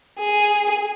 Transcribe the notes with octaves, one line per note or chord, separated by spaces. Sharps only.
G#4